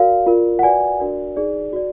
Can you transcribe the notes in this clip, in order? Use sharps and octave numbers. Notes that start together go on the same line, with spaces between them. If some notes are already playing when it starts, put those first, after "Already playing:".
Already playing: F#4 A#4 D5 F5
F4 A#4 D5
F#5
F#4 B4 D5 G#5
D4 F#4 A#4 D5
D#4 G#4 D5
F#4 D5